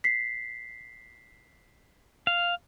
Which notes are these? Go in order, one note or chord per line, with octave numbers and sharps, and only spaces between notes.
B6 C7
F5